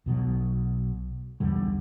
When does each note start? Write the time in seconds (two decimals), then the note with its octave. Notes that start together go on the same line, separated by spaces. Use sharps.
0.06 B1 B2 D3 F#3
1.40 B1 E2 D3 G3